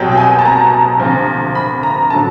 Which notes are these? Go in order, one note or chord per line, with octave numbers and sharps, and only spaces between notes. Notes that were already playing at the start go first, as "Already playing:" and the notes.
Already playing: C2 B2 F#3 G5
G5
G#5
A5
A#5
D2 C3 F3
B5
A#5
D3 F#3 A5